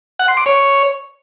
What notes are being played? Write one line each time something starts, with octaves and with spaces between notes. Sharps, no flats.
F#5
C6
D6
C#5